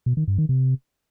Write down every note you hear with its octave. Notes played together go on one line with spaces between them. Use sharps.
B2
D#3
G2
D#3
C3